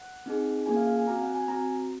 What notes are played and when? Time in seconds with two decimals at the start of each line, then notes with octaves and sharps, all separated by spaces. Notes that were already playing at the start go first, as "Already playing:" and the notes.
Already playing: F#5
0.26 C4 D#4 G#4
0.66 A#3 C#4 F4 G#4 G#5
0.76 F5
0.87 F5
0.96 G#5
1.07 C4 F#4 A#5
1.21 F#5
1.35 G#5
1.48 C4 F#4 A#5